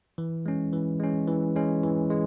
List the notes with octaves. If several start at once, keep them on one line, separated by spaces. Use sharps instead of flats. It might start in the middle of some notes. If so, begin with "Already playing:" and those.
E3
G#3 C#4
E3
G#3 C#4
E3
G#3 C#4
E3
G#3